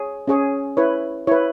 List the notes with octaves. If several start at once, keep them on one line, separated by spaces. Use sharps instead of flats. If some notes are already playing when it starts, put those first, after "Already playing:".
Already playing: G#4 C#5
C#4 G#4 C#5
E4 B4 C#5
E4 B4 C#5